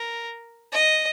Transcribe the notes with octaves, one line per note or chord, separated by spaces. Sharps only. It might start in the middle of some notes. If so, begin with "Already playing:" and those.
Already playing: A#4
D#5